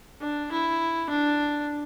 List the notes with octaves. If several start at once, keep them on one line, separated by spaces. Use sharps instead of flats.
D4
E4
D4